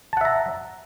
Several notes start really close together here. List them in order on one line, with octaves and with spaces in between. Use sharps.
A5 F#5 E5 A#5